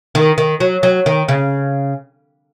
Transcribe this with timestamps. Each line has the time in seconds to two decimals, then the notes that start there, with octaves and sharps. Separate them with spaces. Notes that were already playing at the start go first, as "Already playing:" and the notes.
0.15 D#3
0.38 D#3
0.60 F#3
0.83 F#3
1.06 D#3
1.28 C#3